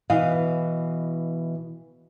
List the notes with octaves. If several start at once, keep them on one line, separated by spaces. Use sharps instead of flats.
B2 E3 D#5 F5